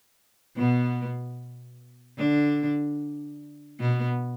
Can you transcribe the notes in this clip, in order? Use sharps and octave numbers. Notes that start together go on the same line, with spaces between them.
B2 B3
D3 D4
B2 B3